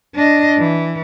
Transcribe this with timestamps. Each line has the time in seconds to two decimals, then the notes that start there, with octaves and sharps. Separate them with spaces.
0.15 D4 D#5
0.59 E3